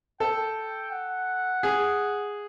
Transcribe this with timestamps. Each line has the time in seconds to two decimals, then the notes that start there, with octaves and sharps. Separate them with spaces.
0.20 A4 G5
0.91 F#5
1.63 G#4